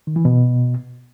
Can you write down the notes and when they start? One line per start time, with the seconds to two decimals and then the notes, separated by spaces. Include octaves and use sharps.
0.07 D#3
0.16 E3
0.25 B2